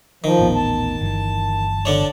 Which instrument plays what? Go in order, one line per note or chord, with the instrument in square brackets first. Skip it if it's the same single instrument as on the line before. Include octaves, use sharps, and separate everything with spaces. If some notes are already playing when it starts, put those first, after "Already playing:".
[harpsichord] D#3 [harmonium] F3
[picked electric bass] D#1 A1 B3
[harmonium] A5
[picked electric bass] G1 E3
[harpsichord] D3 D4 C#5